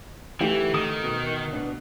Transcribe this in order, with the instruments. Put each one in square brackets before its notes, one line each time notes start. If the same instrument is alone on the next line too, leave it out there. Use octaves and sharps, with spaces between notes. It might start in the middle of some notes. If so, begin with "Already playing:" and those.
[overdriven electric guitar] E3 [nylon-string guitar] A3 D#4 F#4 [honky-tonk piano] G4
[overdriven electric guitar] D#3 [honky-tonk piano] D#6
[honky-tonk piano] B2
[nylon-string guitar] B3 D4